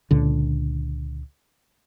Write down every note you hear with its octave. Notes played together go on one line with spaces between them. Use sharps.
C#2 A#2 D3